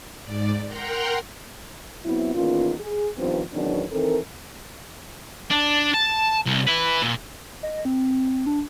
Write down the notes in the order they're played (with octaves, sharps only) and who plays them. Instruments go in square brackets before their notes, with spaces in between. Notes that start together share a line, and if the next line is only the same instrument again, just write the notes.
[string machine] G#2 D5
A#4 F#5 G5 A#5 C6
[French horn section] F#3 B3 C4 E4
E2 D#3 A#3 C#4 F4
G#4
G2 D#3 F3 B3 C4
E2 B2 D#3 F#3 C#4 D4
D#3 E3 C4 A4 A#4
[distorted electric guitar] D4
A5
C2
E4 B4
A#2
[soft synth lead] D#5
C4
D4